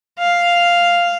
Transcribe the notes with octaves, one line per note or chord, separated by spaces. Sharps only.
F5